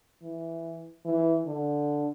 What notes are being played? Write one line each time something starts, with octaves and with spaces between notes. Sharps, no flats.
E3
E3
D3